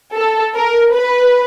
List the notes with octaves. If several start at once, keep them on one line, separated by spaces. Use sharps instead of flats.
A4
A#4
B4